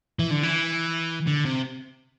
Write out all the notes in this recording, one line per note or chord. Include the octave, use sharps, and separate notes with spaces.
E3
D3
E3
D3
C3